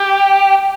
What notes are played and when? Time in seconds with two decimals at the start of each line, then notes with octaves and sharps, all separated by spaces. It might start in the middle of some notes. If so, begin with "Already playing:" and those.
Already playing: G4